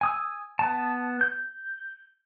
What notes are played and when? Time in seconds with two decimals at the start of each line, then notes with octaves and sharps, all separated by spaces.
0.01 G#5 D#6 E6
0.59 B3 A5
1.21 G6